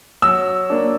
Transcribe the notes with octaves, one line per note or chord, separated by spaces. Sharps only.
F#3 E6
A#3 D4